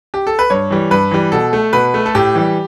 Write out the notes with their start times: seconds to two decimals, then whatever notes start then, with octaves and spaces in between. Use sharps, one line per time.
0.14 G4
0.27 A4
0.39 B4
0.50 G2 C#5
0.70 E3 G3
0.91 G2 B4
1.11 E3 G3
1.32 B2 A4
1.53 A3
1.73 B2 B4
1.94 A3
2.06 A4
2.15 A2 G4
2.35 E3 G3